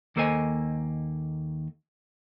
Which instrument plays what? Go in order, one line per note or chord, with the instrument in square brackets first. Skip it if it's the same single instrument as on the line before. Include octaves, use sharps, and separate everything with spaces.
[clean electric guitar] D#2 A#3 A4 C5 D#5 G#5